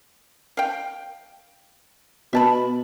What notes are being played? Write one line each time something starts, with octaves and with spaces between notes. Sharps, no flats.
F5 G5
B2 E5 A5 B5